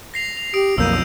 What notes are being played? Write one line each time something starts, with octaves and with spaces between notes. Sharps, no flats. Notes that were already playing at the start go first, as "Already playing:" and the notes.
A#6 C7 F7
F7
G4 D#6 C7 D7
B1 F2 A#3 E6 G6 D#7